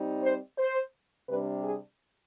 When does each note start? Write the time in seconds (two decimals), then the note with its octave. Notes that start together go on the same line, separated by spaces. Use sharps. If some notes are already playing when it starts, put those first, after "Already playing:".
Already playing: G3 C4 D#4
0.23 C5
0.58 C5
1.28 C3 G3 D4 B4
1.63 G#4